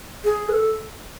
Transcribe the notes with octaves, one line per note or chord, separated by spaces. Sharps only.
G#4
B4
A4